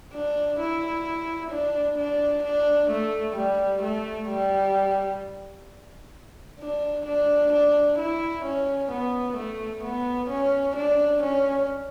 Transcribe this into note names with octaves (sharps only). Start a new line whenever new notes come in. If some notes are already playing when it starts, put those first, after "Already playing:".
D4
E4
D4
D4
D4
A3
G3
A3
G3
D4
D4
D4
E4
C#4
B3
A3
B3
C#4
D4
C#4